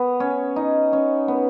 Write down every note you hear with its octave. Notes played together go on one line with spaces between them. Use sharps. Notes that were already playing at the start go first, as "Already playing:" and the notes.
Already playing: B3
C#4
D#4
C#4
B3